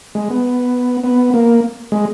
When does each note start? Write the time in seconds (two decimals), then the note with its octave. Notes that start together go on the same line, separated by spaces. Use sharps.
0.15 G#3
0.30 B3
1.04 B3
1.34 A#3
1.92 G#3